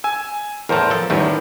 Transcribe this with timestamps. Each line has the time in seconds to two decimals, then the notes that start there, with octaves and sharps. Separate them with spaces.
0.04 G#5 E6
0.69 E2 A2 A#4 C5 A5
0.90 F3 A4
1.10 A1 E2 D#3 G3 A3